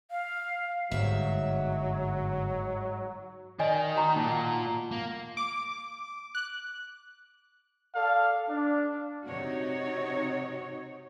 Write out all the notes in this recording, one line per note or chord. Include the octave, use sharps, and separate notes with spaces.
F5
G1 G#2 F#3 E5
D#3 D5 D#5 G#5
F#4 A#5 C#6
A#2 A5
F#5
A#3
D6
F#6
A4 D5 F5
D4
C3 D#4 F#4 C#5